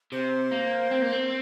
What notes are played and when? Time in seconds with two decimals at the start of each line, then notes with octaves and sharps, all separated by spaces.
0.12 C3 C5
0.51 A#3
0.91 C4
1.02 A#3
1.12 C4